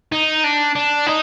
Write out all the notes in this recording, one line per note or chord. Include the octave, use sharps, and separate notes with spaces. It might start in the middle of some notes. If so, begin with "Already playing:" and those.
D#4
D4
D4
D#4